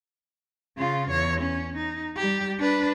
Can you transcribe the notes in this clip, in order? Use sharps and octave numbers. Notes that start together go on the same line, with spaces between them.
C#3 F4
E2 C#5
C#4
D#4
G3 G4
D4 B4